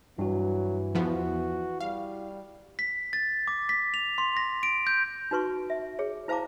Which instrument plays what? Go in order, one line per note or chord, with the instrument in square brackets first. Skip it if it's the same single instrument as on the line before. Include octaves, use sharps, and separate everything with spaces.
[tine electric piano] G2 F#4 [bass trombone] E3 [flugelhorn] F#3
[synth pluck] E2 F3 B3 [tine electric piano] E4 [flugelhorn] F#4
[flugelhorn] G3 [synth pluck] F5
[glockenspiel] B6
A6
D6
B6
F7
C6
A#6
D7
G6
[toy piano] D#4 F#4 B4 C6 C#6
E5
G#4 C#5
E4 C5 F5 A5 A#5 D6